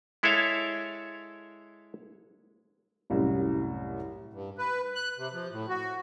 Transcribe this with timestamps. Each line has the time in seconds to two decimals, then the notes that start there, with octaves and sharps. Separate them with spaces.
0.23 G#3 E4 A4 C#5 E5 F5
3.10 C2 F#2 A2
4.31 G2
4.58 B4
4.95 F#6
5.18 C3
5.33 F3
5.51 A2
5.69 F#4